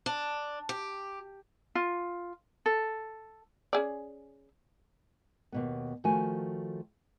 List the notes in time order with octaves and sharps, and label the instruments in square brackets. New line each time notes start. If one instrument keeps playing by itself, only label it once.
[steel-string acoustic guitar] D4
G4
[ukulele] F4
A4
[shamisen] C#4 G#4 D5
[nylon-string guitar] D#2 B2 B3
D#3 F3 A3 F#4 G#5